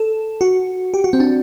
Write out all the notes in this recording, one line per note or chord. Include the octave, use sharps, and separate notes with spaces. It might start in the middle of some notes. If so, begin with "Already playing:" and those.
Already playing: A4
F#4
G4
F#4
C4
D4